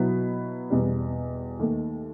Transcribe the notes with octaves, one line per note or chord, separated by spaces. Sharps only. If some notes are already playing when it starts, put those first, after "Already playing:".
Already playing: B2 F#3 B3 E4 B4
E2 B2 G3
D#2 D#3 A3